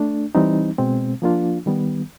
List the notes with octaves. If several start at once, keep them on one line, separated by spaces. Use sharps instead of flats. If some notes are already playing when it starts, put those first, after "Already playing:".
Already playing: A3 D4
E3 G3 C4 D#4
B2 G#3 C4
F3 A#3 D4 F4
D#3 G3 B3